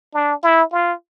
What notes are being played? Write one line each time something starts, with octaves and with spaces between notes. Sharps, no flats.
D4
E4
F4